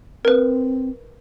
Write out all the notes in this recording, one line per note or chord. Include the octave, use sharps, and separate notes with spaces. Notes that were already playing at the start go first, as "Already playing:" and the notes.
C4 A#4 B4